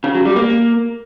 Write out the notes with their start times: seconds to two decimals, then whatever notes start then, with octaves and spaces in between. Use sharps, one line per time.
0.04 C#3
0.15 F#3
0.25 G3
0.36 A#3